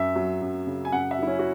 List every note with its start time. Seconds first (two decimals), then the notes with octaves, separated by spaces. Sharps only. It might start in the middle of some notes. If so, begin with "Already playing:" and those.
Already playing: F#2 E5
0.16 F#3
0.42 F#2
0.67 C#3
0.85 G#5
0.92 F#2 F#5
1.11 E5
1.19 F#3 E4
1.27 C#4
1.39 F#4